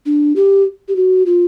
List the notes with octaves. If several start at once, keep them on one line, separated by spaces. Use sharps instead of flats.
D4
G4
G4
F#4
F4